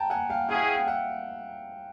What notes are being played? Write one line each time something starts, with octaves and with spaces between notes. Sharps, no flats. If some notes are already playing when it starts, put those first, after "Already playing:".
Already playing: G5 A5 A#5
F#5 G#5
F5 G5
C#4 E4 G#4 F5 G5
F#5
F5 G5
F5 G5
E5 F#5